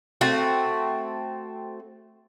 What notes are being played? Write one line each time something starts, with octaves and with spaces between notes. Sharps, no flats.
A3 C4 F#4